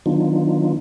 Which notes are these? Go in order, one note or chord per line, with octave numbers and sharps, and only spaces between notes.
D#3 F#3 B3 D4 D#4 F4